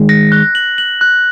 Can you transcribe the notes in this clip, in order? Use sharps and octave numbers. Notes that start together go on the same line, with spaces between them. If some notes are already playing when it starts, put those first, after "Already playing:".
Already playing: D#3 G#3
A#6
F#6
F#7
F#7
F#6